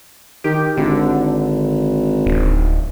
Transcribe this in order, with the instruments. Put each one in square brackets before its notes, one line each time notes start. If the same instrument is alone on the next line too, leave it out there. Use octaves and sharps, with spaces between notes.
[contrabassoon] D#3 [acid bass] G4
[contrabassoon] G#1 [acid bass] D3
[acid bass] D1